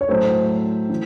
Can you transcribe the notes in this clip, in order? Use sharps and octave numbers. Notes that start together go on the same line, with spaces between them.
C#5
A2 F#3 A3 C5
E3